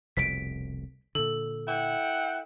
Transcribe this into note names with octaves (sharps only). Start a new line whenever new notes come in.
F1 C2 B2 B6 D7
A#2 D3 A4
E4 F#5 G5